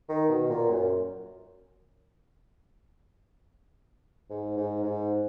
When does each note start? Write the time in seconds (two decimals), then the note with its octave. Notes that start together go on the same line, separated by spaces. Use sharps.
0.09 D#3
0.30 B2
0.50 A#2
0.70 F#2
4.30 G#2
4.57 G#2
4.83 G#2